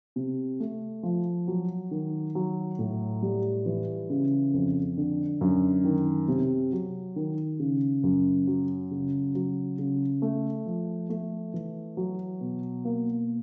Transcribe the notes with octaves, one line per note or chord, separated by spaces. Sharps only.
C3
A3
F3
F#3
D#3
F#3
A2
G3
E3
C#3
F2
D3
F#2
D#3
C3
F#3
D#3
C#3
F#2
F#3
C#3
F#3
C#3
A3
F3
A3
E3
F#3
B2
A#3